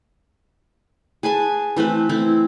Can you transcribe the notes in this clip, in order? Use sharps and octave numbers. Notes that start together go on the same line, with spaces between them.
G#4 B4 G#5 A5
E3 A3 C4 B4
A3 C4 E4